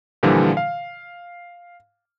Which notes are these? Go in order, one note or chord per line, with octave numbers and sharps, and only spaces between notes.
A#2 D3 E3 F3 G3
F5